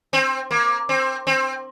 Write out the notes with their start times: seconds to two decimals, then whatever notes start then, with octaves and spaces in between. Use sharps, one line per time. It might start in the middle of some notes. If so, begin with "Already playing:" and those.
0.13 C4
0.51 A#3
0.89 C4
1.27 C4